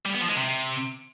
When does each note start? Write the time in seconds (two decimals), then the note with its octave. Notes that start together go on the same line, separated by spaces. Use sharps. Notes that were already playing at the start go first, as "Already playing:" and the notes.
0.06 G3
0.14 B3
0.21 F3
0.29 G#3
0.37 C3